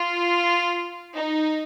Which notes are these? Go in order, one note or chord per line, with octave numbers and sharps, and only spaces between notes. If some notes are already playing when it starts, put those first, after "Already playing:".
Already playing: F4
D#4